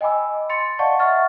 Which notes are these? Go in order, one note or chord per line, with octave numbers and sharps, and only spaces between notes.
D#5 G5 G#5 B5 D6 E6
C6 A6 C#7
D5 D#5 F5 F#5 A5 C#6
E5 F#5 C#6 F6 A6